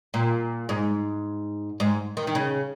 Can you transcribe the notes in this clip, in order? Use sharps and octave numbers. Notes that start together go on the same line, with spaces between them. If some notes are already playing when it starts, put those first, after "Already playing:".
A#2
G#2
G#2
D#3
D#3
C#3